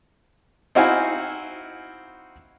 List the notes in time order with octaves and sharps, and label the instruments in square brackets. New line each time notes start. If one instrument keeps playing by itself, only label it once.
[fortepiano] C4 D#4 E4 F#4 F5 G#5